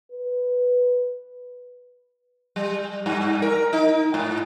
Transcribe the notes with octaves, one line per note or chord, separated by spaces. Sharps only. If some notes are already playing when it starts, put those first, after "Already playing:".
B4
G3
G2
A#4
D#4
G#2